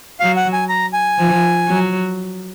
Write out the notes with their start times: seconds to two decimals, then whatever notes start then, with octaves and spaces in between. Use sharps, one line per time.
0.20 F#3 F5
0.36 F#5
0.53 G#5
0.69 A#5
0.93 G#5
1.19 F3
1.68 F#3